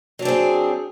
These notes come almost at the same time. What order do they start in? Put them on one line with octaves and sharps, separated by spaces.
F#3 D4 C4 G#4